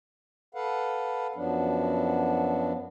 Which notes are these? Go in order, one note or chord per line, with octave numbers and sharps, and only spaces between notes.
A4 B4 F5 F#5
F#2 F3 F#3 B3 D4